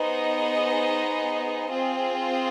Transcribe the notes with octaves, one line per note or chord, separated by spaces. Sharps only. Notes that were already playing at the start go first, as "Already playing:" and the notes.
Already playing: B3 D#4 G#4 C5 D#5
C4 F4 G#4